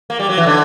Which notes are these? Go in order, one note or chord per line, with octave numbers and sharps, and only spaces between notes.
A#3
G3
F#3
E3
D3